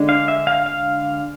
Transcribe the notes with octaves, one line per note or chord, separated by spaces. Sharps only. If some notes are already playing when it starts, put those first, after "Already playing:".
Already playing: D3 G#3 D4
F5
E5
F5
F5